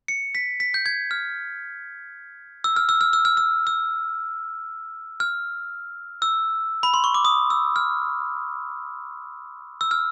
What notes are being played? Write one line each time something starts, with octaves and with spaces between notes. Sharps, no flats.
C#7
B6
B6
G6
G#6
F6
E6
F6
E6
F6
E6
F6
E6
E6
F6
E6
B5
C6
C#6
D6
D#6
E6
F6
E6
F6